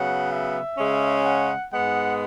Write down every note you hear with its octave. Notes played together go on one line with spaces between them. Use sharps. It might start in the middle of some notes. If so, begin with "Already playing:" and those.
Already playing: C#3 F#3 B3 F#5
E5
C#3 G#3 C#4
F#5
G#2 G#3 B3 F#5